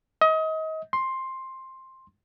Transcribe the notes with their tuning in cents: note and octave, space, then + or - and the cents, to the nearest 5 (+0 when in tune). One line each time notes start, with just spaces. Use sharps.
D#5 +30
C6 +10